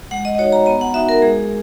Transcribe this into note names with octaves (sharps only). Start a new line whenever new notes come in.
G#3 F#5
D#5
D#5
D#4 F#4 C#5
A#5
B3 A#5
F#5
D#4 F#4 E5
A#4
G#3 G#4